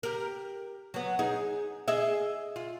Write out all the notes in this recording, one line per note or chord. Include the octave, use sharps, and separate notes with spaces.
G4 A#4
F#3 B3
D#4 G#4
G#4 D#5 E5
F4